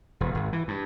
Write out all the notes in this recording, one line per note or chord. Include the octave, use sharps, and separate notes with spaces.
E1
G#1
E3
G2